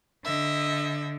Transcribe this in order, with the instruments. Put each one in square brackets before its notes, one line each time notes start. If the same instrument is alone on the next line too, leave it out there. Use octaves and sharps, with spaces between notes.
[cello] D3 [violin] D#5 E5